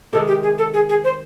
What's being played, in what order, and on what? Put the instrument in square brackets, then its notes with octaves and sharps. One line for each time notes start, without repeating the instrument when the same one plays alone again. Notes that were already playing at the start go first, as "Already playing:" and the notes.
[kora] C3 D#3 G#3 [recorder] A4
[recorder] G4
G#4
A4
G#4
G#4
C5